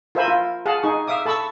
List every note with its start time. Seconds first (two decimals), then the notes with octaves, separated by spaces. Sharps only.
0.15 F4 A#4 C5 E5 G#5 B5
0.28 F4
0.66 G#4 F5 F#5 A5
0.83 D#4 G#4 C#6
1.07 E5 F5 D6 D#6
1.26 A4 A5 B5 C#6 E6